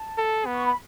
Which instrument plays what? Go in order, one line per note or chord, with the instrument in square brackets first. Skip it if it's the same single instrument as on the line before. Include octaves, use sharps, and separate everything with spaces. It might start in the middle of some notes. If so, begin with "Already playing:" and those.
Already playing: [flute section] A5
[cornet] A4
B3
[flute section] C#6
B5